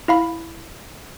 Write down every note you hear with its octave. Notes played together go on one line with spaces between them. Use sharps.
E4 F5 B5